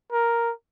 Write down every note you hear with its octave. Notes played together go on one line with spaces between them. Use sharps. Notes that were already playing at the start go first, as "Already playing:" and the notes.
A#4